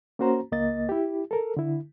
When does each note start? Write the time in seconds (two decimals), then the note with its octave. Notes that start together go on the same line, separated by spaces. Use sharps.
0.19 A#3 C#4 F#4 C5 A#5
0.52 C#2 A#3 D#5 A6
0.89 E4 G4
1.31 A4 A#4
1.57 D3 E4